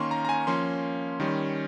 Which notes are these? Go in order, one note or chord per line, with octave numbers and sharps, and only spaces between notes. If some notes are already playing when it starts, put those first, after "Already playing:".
Already playing: D#3 A#3 C#4 C6 C#6
A#5
A#5
G#5
F3 A#3 C#4 C6
D#3 G3 C#4